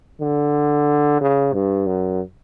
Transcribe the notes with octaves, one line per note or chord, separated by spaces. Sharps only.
D3
C#3
G2
F#2